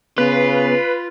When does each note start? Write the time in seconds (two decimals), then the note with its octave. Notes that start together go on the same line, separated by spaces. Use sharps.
0.18 C#3 B3 F4 B4